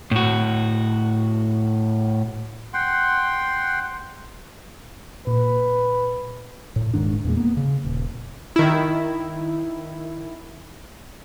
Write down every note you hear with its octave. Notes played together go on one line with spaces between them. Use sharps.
A2 F#4
F#5 G5 C6
A#2 B4
A2
D#1 G#2 D#3 D4
E2 A#2 G#3
A#3 B3
C#3
D#1
D#3 E4